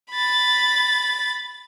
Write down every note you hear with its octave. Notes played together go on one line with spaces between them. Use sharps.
B5 A6